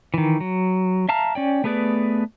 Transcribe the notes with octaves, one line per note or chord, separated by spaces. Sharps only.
D#3 E3
F#3
E5 F5 A5 A#5 F6
C#4 D5 G5
A3 B3 G#4 B4 D5